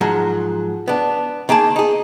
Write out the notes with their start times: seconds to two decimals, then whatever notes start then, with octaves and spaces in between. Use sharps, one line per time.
0.01 G#2 F3 F#3
0.88 B3 D4
1.49 D#3 A#3 G#4 A5
1.76 D#4 G#4